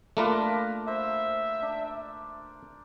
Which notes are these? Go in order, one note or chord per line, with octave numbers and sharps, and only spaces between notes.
A3 A#3 D4 F4 A#4 B4
C5 E5
D4